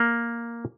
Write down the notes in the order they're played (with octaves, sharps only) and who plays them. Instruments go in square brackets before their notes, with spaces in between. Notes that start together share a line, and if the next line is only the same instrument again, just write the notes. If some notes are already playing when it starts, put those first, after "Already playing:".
Already playing: [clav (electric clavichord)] A#3